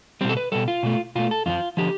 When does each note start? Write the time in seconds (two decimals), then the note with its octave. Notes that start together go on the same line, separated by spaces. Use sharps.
0.21 B2 G3 C4
0.29 A4
0.37 B4
0.52 B2 G3 A4
0.68 F4
0.83 B2 A3
1.15 B2 A3 F4
1.31 A4
1.46 F2 D3 F3 F4
1.77 D3 F3 G4